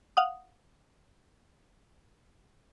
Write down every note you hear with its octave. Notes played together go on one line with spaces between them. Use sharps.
F5 F#5 D#6